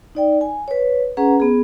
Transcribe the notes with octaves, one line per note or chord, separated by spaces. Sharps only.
D#4 D5 G5
G#5
B4 C#5
C#4 G#4 B4 F#5 A#5
B3 G#4